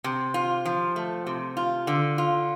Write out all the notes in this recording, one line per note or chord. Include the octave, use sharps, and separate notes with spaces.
C3
F4
F3
A3
C3
F4
D3
F4